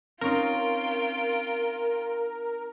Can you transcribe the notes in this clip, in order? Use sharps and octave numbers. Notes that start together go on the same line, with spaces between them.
C4 C#4 D#4 F4 A#4 G5